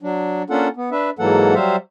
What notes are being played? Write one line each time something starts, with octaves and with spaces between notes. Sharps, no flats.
F#3 D4
A#3 C#4 D4 F4 A4 F#5
B3
D4 B4 E5
G#2 E3 F#3 A#3 A4 F#5
F#3 G3 C5 E5 F5